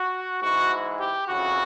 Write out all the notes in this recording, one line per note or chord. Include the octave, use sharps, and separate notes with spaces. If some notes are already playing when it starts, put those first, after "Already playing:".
Already playing: F#4
G#2 E3 F#4
G4
F2 C#3 E3 F#4